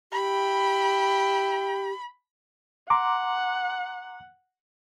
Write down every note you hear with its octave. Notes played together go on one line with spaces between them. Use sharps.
E4 G4 G5 B5
F#5 A#5 C6 D6